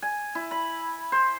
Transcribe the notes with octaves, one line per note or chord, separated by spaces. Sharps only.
G#5
E4
B5
C5